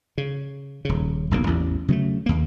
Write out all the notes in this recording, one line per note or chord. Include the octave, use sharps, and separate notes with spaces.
C#3
D#1 C#3
F#1 B1 A#2 A#3
A1 E2
C#3 F#3 G#3 A3
D#2 A#3